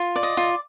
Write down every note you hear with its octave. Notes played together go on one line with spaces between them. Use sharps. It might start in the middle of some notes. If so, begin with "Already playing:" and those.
Already playing: F4
D5
D#5
F4